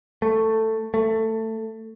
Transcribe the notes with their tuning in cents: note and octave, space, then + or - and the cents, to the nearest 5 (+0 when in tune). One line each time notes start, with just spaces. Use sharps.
A3 +10
A3 +15